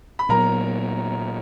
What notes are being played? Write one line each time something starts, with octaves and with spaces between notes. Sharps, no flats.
B5
A#2 F#3 B3 A#4 A#5